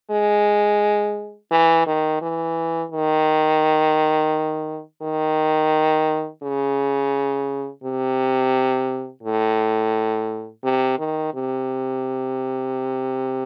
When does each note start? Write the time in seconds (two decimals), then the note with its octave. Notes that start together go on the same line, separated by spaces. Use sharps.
0.11 G#3
1.51 E3
1.86 D#3
2.22 E3
2.92 D#3
5.02 D#3
6.43 C#3
7.84 C3
9.23 A2
10.64 C3
10.99 D#3
11.34 C3